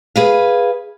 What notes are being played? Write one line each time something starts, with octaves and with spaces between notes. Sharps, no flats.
G#4 B4 F5